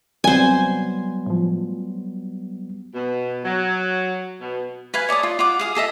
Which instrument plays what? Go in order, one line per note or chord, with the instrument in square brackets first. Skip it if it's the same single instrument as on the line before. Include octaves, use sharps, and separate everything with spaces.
[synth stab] C#2 C3 C4 [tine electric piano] F#3 G3 B3 [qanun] C5 G#5
[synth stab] A2 F3
[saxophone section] B2
F#3
B2
[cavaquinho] B4 F5 G#5
C#5 D5 A5 D#6
F4
F4 F#5 D6
G#4 F5 D#6
G#4 A4 D#5 E5